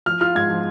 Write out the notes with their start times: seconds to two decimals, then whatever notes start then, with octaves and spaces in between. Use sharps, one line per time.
0.06 F3 F6
0.21 F4 F6
0.35 G#2 G#6
0.50 F3